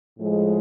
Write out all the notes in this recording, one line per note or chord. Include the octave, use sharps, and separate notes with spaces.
A2 F3 G#3